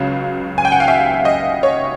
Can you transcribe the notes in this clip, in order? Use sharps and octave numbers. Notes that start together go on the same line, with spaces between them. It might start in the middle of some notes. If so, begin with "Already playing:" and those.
Already playing: C#2 C#3 F#3 F5
G#5
G5
F#5
F5
E5
D#5
C#5